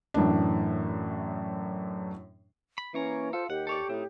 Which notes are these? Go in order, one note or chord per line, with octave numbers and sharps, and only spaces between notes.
F#2 A2 E3 D4
B5
E3 A#3 C#4 C#5 A#5
F4 A4 C5
D#2 G4 F#5
A4 C#5 D5
A2 C4 D#4